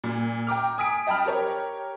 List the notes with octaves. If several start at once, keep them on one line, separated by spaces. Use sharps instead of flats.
A#2
G5 A#5 D6 F6
G#5 D#6 B6 D7
D#5 G5 A5 B5 F6
G4 A#4 C#5